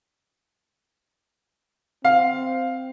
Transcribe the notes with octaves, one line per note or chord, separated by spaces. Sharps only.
C4 F5